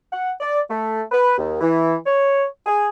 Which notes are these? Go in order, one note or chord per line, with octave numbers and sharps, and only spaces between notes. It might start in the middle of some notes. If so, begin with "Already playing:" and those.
F#5
D5
A3
B4
D#2
E3
C#5
G#4